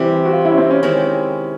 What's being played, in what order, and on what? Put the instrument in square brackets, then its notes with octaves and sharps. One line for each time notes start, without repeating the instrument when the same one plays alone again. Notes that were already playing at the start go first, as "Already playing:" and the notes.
Already playing: [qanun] C3 E3 G3 [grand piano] E4
[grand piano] F#4
F4
E4
C#4
C4
C#4
[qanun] D#3 G#3 C4 E4 [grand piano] C#4